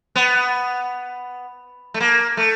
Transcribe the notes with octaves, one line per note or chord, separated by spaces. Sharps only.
B3
A3
A#3
A3